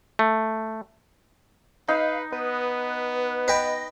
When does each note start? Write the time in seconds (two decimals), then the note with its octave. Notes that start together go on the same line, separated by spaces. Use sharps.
0.19 A3
1.88 D#4 B4 F5
2.32 B3 B4
3.48 B4 D#5 G5